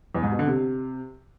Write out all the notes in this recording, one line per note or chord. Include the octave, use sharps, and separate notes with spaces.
E2
G#2
B2
D3
C3